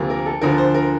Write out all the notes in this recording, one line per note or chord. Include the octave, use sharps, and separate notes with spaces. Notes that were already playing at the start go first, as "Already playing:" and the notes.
Already playing: D2 C3 F3 A#3
A#4
A4
D2 D3 F3 A#4
C5
A#4